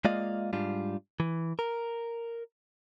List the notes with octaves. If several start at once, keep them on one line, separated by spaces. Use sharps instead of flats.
G#3 A#3 F4 D5 D#5 F5
G#2 G3 D4 F4
E3
A#4